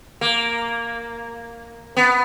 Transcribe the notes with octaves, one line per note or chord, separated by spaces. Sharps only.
A#3
B3